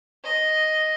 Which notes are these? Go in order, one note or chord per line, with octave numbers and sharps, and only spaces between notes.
D#5